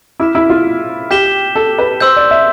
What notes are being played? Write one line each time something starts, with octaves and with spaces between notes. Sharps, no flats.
E4 D6 F6 B6 E7
E4
F4
G4 G6 B6 E7 G7
A4
B4
C5 C6 E6 G6
D5
E5